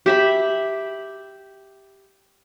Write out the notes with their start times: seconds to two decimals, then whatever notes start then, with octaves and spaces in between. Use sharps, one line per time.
0.06 G4 E5 B5